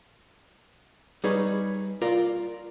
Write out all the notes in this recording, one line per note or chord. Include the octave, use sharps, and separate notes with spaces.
G3 D#4 G#4 B4 C#5
F4 A#4 D5